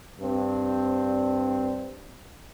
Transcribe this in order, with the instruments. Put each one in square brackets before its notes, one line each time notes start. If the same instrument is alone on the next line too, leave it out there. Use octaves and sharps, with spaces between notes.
[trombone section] G2 C4 D4